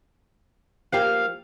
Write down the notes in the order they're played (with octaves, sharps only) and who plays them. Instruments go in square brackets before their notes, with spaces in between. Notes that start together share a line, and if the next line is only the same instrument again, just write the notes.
[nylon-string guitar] F3 A#3 G4 [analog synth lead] F5